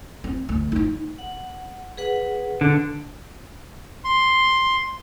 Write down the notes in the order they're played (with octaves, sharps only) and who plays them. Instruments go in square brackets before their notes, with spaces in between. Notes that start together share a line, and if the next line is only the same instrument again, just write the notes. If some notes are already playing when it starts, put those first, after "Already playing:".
[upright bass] C4
D2
D#4 E4
[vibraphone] F#5
G#4 B4 F#5
[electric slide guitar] D3
[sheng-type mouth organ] C6